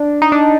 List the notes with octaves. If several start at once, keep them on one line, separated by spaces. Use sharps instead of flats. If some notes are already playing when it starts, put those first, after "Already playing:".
Already playing: D4
D#4
D4